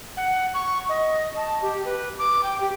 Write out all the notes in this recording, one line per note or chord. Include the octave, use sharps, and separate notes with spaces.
F#5
C#6
D#5
A5
G4
B4
D6
G5
G4